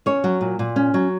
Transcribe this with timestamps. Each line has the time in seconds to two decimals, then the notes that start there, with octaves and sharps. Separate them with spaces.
0.06 C#4 C#5
0.24 F#3
0.41 A#2
0.59 A#2
0.76 C#4
0.94 F#3